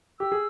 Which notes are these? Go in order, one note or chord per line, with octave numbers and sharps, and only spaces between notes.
G4 E6
G#4